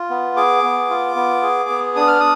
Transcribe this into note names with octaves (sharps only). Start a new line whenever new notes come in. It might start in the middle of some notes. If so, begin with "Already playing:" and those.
Already playing: F4
B3
G#4 D6
B3
F4
B3
G#4
B3
D4 D#6
F6
D#6